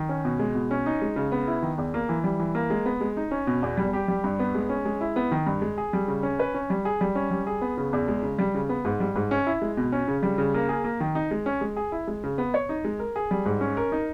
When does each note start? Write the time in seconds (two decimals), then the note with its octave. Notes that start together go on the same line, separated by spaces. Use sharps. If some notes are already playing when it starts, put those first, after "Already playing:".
Already playing: D#3
0.09 C#4
0.25 B2
0.39 G#3
0.55 B2
0.71 C#4
0.86 D#4
1.01 G#3
1.16 C#3
1.32 B3
1.48 E4
1.62 D#3
1.78 E2
1.94 A#3
2.09 E3
2.24 G3
2.40 E3
2.55 A#3
2.70 G#3
2.86 B3
3.01 G#3
3.17 D#4
3.31 C#4
3.47 B2
3.62 E2
3.77 G3
3.93 G4
4.08 G3
4.24 G2
4.39 B3
4.55 G#3
4.69 C#4
4.85 G#3
5.01 E4
5.16 B3
5.31 D#3
5.47 G2
5.62 G#3
5.78 G#4
5.93 G3
6.08 C#3
6.23 C#4
6.39 B4
6.54 C#4
6.70 G3
6.85 G#4
7.01 G3
7.15 C#4
7.31 G3
7.47 G#4
7.61 B3
7.77 C#3
7.93 E2
8.08 G#3
8.23 C#3
8.39 G3
8.54 C#3
8.69 B3
8.85 G#2
9.00 G3
9.16 G#2
9.31 C#4
9.47 E4
9.62 G#3
9.77 B2
9.92 C#4
10.08 C#3
10.23 G3
10.38 C#3
10.54 A#3
10.69 G#4
10.84 A#3
11.00 D#3
11.15 D#4
11.31 G#3
11.46 C#4
11.61 G#3
11.76 G#4
11.92 E4
12.07 G#3
12.23 C#3
12.38 B3
12.54 C#5
12.69 D#4
12.84 G#3
12.99 A#4
13.16 G#4
13.31 G3
13.46 G#2
13.61 C#4
13.77 A#4
13.92 D#4